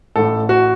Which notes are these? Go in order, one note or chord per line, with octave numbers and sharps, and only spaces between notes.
A1 A2 A4
F#4